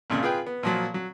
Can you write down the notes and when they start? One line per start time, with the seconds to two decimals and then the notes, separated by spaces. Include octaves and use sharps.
0.10 G#1 A#2 C#3
0.23 F4 G#4 B4 G5
0.46 B3
0.63 A#2 F3 F#3
0.94 F#3